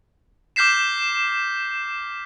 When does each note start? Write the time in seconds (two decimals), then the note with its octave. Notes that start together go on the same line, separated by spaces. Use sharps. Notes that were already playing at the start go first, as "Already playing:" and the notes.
0.56 D6 F6 G6 B6 C7 E7